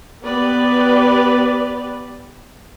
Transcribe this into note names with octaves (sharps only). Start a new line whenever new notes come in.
B3 G4 B4 D5